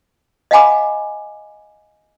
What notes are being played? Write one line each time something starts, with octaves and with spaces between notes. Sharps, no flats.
D#5 F5 F#5 G#5 B5 D6